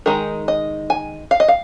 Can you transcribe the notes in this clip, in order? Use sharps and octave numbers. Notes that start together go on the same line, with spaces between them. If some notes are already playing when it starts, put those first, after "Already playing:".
D#3 G#3 D#4 A#4
D#5
G#5
F5
D#5
F5